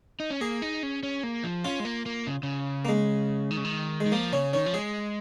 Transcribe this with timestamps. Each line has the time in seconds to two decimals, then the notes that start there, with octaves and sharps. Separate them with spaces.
0.20 D#4
0.30 C#4
0.41 A#3 G#4
0.62 D#4
0.83 C#4
1.03 C#4
1.23 A#3
1.44 F3
1.65 C#4 F4
1.80 G#3
1.85 A#3
2.06 A#3
2.27 C#3
2.43 C#3
2.85 A#3
2.89 G#3
3.51 D#3
3.57 C#3
3.65 D#3
4.00 G#3
4.06 D#3
4.12 F3 A#3
4.33 C#3 C#4
4.53 D#3 C#4
4.66 F3
4.73 G#3 G#4